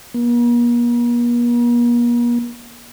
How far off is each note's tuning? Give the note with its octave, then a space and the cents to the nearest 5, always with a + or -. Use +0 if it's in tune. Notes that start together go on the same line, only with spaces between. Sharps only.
A#3 +45